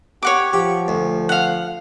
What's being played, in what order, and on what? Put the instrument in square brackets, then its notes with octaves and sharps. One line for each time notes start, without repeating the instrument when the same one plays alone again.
[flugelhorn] G4 [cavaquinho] C#5 F#5 D6
[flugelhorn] F3 [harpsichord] G4
[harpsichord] D2
[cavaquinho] F5 F#5